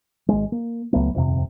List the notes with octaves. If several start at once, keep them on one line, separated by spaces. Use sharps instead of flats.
G#1 G#3
A#3
C#2 F#3 A3 B3
D#1 F2 C3